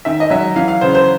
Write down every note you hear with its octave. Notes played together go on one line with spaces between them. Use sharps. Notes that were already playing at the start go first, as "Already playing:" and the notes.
D#3 E5
D#5
F#3 E5
E3 F5
F5
C#3 C5
C5